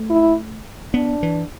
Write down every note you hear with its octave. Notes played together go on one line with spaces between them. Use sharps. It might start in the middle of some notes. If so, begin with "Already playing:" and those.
Already playing: A3
E4
B3 D4
E3